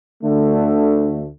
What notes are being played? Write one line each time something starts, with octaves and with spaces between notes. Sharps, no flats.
D2 D3 A3